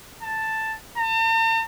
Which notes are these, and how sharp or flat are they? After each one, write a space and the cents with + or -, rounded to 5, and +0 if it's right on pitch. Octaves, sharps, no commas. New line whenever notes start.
A5 +5
A5 +45